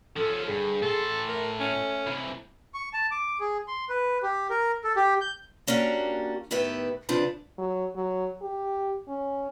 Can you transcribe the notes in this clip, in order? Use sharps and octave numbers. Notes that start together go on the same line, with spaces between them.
F3 C#4 A4
G2 D3 G#4
A2 A4 C6
A3 A#4
C#4
C3 E3
C#6
A5
D6
G#4
C6
B4
G4
A#4
A4
G4
G6
A#3 C#4 D4 F#4 G4
A2 D#3 B3 G4 B4 E5
C#3 F3 C4 D4 B4
F#3
F#3
G4
C#4